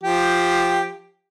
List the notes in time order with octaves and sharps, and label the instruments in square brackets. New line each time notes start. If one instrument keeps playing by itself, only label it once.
[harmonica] F3 G4